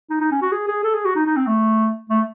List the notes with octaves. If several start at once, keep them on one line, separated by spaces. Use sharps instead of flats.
D#4
D#4
C#4
F#4
G#4
G#4
A4
G#4
F#4
D#4
D#4
C4
A3
A3